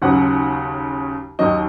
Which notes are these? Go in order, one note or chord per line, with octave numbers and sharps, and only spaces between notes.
D#2 C#3 F#3 F#5
D#2 D#3 F#3 D#5